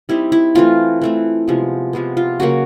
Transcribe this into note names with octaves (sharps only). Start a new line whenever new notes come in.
G3 C4 D#4 E4
E4
E3 A3 C4 F4
E3 A3 C4
C3 F3 G#3 B3
C3 F3 G#3 B3
F4
C#3 F#3 A#3 F#4